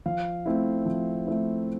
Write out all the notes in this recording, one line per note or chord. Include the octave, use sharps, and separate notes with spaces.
F3 F5
A3 C4 E4
F3
A3 C4 E4